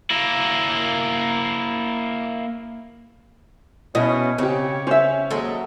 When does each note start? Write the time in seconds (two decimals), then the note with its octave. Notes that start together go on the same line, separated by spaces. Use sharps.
0.11 A#3 E4
3.95 B2 C#4 E4 D#5
4.38 C#3 C4 G4 C#5
4.87 C#4 C5 E5
5.31 D#2 F#3 G#3 A4